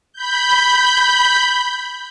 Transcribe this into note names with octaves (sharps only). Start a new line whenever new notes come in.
B5 G6